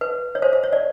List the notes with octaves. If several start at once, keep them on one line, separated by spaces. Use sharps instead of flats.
B4
C#5
C5
C5
C#5
D5